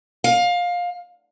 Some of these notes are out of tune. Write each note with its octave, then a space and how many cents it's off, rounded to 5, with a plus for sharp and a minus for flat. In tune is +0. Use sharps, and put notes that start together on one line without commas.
F5 +20